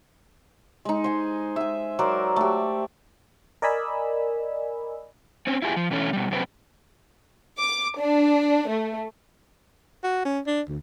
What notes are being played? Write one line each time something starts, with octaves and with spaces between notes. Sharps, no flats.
G#3 D#4
C5 G#5
E5 G#5
F#3 A#4 C5 D5
A3 G4
A#4 D5 D#5 G#5 B5 E6
C4 C#4
E4 F4 G4 G#4
F3
B2 D3 E3 A3 C#4
B2 G3
F#2 C3 C4 F4 B4
D6
D4
A3
F#4
C#4
D4
D2